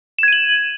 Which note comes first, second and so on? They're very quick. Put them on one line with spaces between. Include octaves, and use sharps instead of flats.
E7 G#6 D#7 F#7